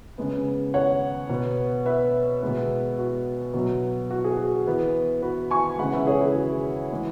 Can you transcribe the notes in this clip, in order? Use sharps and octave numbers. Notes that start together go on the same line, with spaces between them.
C#3 G#3 B3
C#5 F#5
B2 B3
B4 E5
B2 G#3 B3
F#4
B2 F#3 B3
F#4
G#4
F#4
E3 B3
F#4 B4
G#5 C#6
C#3 E3 G#3 F#5 B5
B4 E5
G#4 C#5
E4 G#4
F#4
E3 G#3 B3